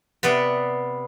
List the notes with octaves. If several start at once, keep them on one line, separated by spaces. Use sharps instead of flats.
C3 B3 B4 D5